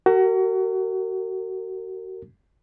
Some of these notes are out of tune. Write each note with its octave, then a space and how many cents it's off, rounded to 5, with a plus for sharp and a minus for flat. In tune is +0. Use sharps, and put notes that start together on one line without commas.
F#4 +30 A#4 -35